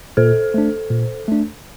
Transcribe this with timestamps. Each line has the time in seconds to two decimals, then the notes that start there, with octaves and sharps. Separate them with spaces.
0.17 A#2 A4 C5
0.54 A3 D4
0.91 A#2
1.28 A3 D4